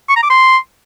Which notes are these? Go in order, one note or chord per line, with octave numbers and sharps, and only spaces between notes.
C#6
A#5
D6
C6